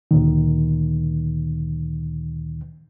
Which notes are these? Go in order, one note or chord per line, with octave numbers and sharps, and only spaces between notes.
D2 A#2 D#3